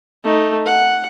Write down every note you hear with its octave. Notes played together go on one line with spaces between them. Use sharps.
A3 D#4
F#5